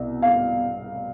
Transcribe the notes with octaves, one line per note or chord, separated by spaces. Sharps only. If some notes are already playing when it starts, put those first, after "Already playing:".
Already playing: C2 B2
F5